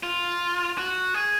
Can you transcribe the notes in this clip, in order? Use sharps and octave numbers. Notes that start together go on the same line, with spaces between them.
F4
F#4
G#4